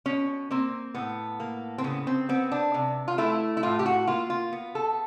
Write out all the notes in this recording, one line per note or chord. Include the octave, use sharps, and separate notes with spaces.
B2 C#4
A#3 C4
A2 B3
A#3
C4
C#3 B3
C4
B3 C4
D4
C3
F4
A3 E4
E4
A2 F4
G4
F#4
A#3 F4
F4
B3
A4